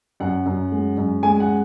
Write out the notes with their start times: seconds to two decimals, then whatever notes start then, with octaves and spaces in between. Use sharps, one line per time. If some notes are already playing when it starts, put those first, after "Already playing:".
0.20 F#2 F#5
0.46 F#2
0.72 G#3
0.98 F#2
1.23 G#3 G#5
1.40 F#5